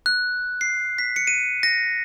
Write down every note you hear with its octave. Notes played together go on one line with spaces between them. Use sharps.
F#6
C7
B6
C#7
D#7
A#6